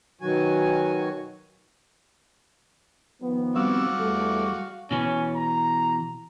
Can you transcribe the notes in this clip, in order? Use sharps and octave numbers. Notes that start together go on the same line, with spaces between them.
B2 D#3 F#3 F#4 G#5
D#3 F3 B3
G3 C4 F#4 D5 F5 E6
E2 G3 A3 A4
B2 E3 C#4
A#5